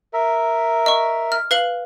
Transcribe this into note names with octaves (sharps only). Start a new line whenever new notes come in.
A#4 E5
D#5 C#6
F6
B4 F5 F#7